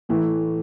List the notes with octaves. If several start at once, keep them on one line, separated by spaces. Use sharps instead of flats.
A2 E3 A3